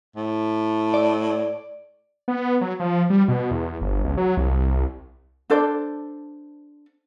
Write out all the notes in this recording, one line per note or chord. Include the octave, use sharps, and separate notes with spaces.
A2
D5
B3
F#3
F3
G3
B2
E2
G1
C#2
F#3
C2
D4 A4 C5 D5